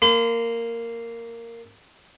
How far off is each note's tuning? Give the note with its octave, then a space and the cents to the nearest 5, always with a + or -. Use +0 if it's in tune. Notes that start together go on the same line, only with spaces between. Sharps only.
A#3 -10 C6 -45